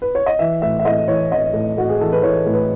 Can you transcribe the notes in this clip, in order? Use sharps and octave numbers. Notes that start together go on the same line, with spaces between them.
B4
C#5
D#5
E3 E5
A2 E5
E5
A2 D#5
E3 C#5
E3 D#5
A2
A2 F#4
G#4
E3 A4
B4
E3 C#5
A2
B4